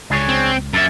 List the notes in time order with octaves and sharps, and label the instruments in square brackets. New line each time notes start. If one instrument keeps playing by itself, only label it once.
[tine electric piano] C#2 [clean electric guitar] D4 G#4 C#5
[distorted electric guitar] C4
[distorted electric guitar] F#2 E5 [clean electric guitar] A#3 A4